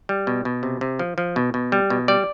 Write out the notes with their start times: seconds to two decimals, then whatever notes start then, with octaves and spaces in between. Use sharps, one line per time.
0.09 G3
0.27 B2
0.45 B2
0.63 C3
0.81 C3
0.99 F3
1.18 F3
1.36 B2
1.54 B2
1.72 G3
1.90 B2
2.08 G3 D5